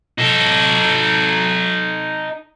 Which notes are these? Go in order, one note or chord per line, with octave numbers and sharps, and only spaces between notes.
D#4 A4